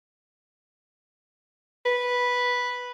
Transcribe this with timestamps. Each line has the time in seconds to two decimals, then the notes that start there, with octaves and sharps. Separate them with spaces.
1.86 B4